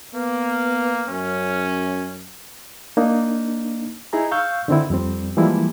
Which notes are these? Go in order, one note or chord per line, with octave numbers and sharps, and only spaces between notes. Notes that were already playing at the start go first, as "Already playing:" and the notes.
A#3 B3
F#2 C#4
A#3 D4 D#4
D#4 E4 G#4 A#5
F5 C#6 E6 G6
D3 D#3 C4 D#4 E4
F2 G3 C4
E3 F3 G3 G#3 A#3 E4